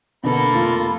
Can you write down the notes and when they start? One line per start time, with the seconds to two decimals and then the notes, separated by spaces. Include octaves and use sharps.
0.23 B2 D3 A#3 A4 B4 B5
0.54 F1 F4 A6